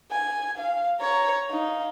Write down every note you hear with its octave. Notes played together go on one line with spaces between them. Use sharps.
G#5
F5
C#5 A#5
D#4 F5